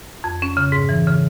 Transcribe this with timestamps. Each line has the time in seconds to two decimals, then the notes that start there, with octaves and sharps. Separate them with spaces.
0.24 F2
0.42 C#4
0.57 C#3
0.72 G#2
0.89 E3
1.07 C#3